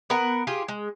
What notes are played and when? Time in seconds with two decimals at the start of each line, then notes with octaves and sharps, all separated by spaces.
0.10 B3 A#4 F#5
0.47 F4 G4 G#4
0.68 G#3